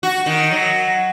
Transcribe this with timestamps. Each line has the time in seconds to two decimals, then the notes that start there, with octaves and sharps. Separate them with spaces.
0.03 F#4
0.26 D#3
0.52 F#3